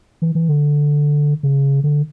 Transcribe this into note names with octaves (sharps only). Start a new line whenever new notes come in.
E3
E3
D3
C#3
D3